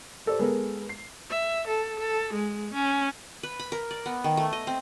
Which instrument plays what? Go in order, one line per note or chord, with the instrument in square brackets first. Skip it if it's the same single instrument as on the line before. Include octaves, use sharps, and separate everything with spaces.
[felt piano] G4 A4 C5 D5
G#3 B3 A4 A#4
C7
[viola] E5
A4
A4
G#3
C#4
[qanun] B4
B5
A#4
D5
B3
D#3
A3
D#5
C4